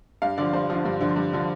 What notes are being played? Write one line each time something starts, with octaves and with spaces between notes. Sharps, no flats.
G2 F5
D3 F3 D5
G2 C5
D3 F3
G2
D3 F3
G2
D3 F3